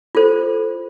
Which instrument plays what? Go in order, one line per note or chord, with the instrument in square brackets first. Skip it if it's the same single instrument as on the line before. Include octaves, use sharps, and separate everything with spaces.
[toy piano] F4 A4 C5